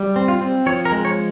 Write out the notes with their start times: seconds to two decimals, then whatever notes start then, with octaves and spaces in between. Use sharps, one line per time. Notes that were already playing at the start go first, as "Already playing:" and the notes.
Already playing: G3
0.16 C4
0.28 F4
0.41 C4
0.66 F3 C#5
0.85 A#4
0.92 G#3
1.05 C#5